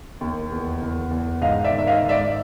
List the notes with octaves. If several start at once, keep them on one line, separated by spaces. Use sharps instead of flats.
D#2
E2
E2
E2
G#2 D#5 F5
D5 E5
D#3
E5
D#5 F5
G#2
D5 E5